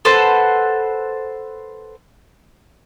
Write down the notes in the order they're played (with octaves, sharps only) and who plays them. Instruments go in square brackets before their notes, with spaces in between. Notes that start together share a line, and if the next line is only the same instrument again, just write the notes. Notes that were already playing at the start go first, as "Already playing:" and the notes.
[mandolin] A4 B4 C5 F#5